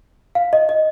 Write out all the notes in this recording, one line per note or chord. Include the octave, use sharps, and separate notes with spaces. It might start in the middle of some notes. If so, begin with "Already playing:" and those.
F5
D#5
D#5